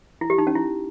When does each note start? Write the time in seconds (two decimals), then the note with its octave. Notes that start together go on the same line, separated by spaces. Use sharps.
0.21 E4
0.30 G4
0.38 D#4
0.47 C#4
0.55 E4